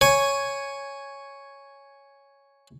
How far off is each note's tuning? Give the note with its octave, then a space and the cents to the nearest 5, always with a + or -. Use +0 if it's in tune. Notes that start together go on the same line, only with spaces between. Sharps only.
C#5 +0 G#5 +0